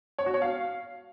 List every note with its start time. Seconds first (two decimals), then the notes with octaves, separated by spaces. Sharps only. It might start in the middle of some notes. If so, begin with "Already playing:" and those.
0.18 C#5
0.26 F#4
0.34 C#5
0.42 F5